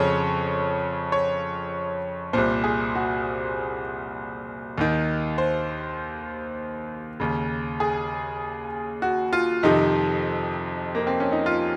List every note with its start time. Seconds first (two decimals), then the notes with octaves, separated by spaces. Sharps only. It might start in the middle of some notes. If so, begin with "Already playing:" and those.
Already playing: F2 C#3 C#5
1.12 C#5
2.33 C2 A#2 C5
2.64 G#4
2.95 F#4
4.78 D#2 D#3
5.38 C5
7.20 D#2 C#3
7.80 G#4
9.02 F#4
9.33 F4
9.63 F2 C3 D#3 D#4
10.95 A#3
11.07 C4
11.20 C#4
11.32 D#4
11.46 F4